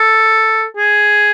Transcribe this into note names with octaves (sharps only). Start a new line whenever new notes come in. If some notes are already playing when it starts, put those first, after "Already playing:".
Already playing: A4
G#4